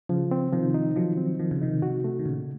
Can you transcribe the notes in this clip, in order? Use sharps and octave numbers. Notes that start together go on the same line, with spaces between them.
C#3 F3
C4
C3 D#3 F3
D#4
D#3 F3 F#3
C4
D#3 F3
C#3
C3 D#3 D#4
C3 F#4
A3
D#3
A#2 C#3